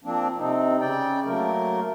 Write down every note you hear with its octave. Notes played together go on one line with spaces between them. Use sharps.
F3 A#3 C4 D4
C3 C4 D#4
C#3 D5 G5
F#3 A3 A#3 A#4